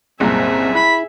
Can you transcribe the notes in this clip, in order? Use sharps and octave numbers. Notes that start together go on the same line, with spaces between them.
F#1 C2 A#2 C4 G#4 E5
E4 B5